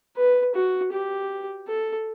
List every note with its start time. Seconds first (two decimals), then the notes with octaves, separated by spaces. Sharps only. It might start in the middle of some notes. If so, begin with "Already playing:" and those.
0.17 B4
0.55 F#4
0.93 G4
1.68 A4